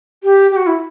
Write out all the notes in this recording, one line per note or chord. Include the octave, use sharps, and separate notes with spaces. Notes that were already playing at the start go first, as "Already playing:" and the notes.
G4
G4
F#4
E4